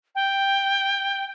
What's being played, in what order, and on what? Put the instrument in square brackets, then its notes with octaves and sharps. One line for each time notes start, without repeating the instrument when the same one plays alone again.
[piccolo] G5